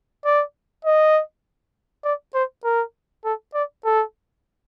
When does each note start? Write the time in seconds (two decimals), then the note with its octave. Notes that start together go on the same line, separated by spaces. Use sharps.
0.25 D5
0.85 D#5
2.04 D5
2.34 C5
2.64 A#4
3.24 A4
3.54 D5
3.85 A4